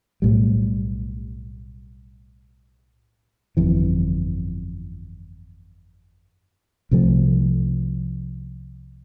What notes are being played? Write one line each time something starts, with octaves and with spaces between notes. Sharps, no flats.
B1 A2 G3
G1 F2 E3
C2 C3 F3 A3